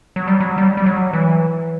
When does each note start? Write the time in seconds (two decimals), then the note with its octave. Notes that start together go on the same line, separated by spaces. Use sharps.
0.16 F#3
0.28 G3
0.40 F#3
0.58 G3
0.77 G3
0.86 F#3
1.13 E3